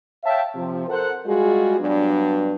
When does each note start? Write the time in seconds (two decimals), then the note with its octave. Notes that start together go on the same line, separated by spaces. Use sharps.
0.24 C#5 E5 F5 G5 A5
0.55 C3 F3
0.88 A4 A#4 C5 F#5
1.26 G3 G#3 F4 F#4 G#4
1.79 G2 F#3 B3 D4